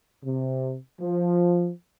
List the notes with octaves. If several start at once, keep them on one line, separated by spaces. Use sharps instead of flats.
C3
F3